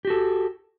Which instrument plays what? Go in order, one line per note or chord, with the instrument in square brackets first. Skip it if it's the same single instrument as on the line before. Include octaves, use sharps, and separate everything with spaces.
[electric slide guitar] G4
F#4
A4